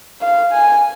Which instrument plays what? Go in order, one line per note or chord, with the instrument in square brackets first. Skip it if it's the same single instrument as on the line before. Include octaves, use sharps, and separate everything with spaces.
[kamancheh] F5
G#5